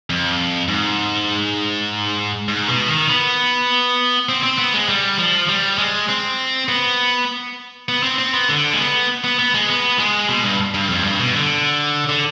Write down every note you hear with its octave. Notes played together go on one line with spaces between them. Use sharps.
F2
G#2
G#2
B2
D#3
B3
C4
C4
B3
G#3
G3
F3
G3
G#3
C4
B3
B3
C4
C4
B3
D3
G#3
B3
B3
B3
G#3
B3
G#3
B2
G2
G2
F2
G2
B2
D3
D3